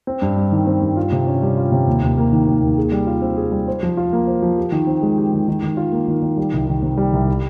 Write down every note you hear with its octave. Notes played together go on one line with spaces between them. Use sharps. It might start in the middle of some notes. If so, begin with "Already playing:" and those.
C4
G2
G3
D#3
C4
G2
F4
C3
C#4
G3
F4
C3
D#2
D#2
A#3
D#3
D#2
D#2
G#4
G3
F4
C4
G#4
G3
C5
F3
F4
A#3
C5
F3
G4
D#3
C4
G#3
G4
D#3
D#3
D#3
F4
A#3
D#3
D#3
G3
C2
D#3
C3
G3
C2
G4